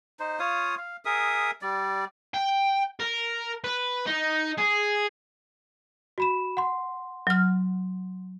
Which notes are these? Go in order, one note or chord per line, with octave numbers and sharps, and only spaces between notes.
D#4 C5
F4 C#5 F5 D#6
F5
G#4 A#4 E5 D#6
G3 D5
G5
A#4
B4
D#4
G#4
F#4 B5 E7
F#5 C6
F#3 F6